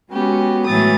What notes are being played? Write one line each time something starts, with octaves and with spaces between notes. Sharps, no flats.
G#3 B3 C#4 F#4 G4
A2 E3 F#3 G#3 D#6 A6